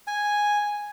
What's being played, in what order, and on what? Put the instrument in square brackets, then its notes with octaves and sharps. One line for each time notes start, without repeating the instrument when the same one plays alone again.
[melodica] G#5